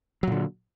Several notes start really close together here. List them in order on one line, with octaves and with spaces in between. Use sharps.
F#3 A#2 D3